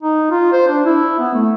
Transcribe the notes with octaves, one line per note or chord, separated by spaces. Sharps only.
D#4
F4
C5
D4
E4
B3
A3